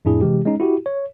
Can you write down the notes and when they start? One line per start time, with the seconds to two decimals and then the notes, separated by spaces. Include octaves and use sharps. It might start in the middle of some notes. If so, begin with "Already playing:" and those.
0.05 F2 A2 D4 E4 G#4
0.21 C3 E3 G#3 G4
0.45 G#3 C#4 D#4
0.60 E4 F#4 G4
0.86 C#5